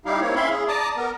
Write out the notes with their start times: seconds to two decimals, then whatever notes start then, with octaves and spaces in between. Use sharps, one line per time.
0.06 G3 D#4 E4 G4 F5
0.20 A#3 C4 C#5
0.36 C#4 E4 E5 F5 B5 C6
0.50 G#4
0.68 D5 A5 A#5 D6 D#6
0.97 B3 A#4